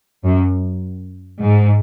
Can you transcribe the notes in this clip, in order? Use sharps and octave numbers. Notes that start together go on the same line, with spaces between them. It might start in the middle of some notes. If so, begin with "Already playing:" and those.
F#2
G#2